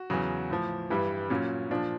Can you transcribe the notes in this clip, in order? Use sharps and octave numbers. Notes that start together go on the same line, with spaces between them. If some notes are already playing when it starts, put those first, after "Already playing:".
Already playing: F#4
E2 C#3 F#3
A2 F3
G2 E3 G3
A#2 F#3 C#4
A#2 F3 D4